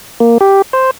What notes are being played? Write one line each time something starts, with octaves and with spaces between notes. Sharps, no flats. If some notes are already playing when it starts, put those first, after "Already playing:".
A#3
G4
C5